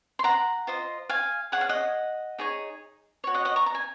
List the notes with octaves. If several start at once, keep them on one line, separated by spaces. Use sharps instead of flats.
C6
F#5 A#5
F4 C5 D#5
F5 G#5
G#4 C#5 F#5
F5
D#5 F#5
D#4 G#4 C#5
F#4 C#5
D#5 F#5
D#5 F#5
A#5 C#6
A#5
G#5